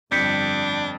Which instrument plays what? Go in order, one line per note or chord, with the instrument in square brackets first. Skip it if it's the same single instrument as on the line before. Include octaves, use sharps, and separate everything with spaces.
[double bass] G1 G3 [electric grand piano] F2 [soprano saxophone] D4 [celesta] G6 B6 C#7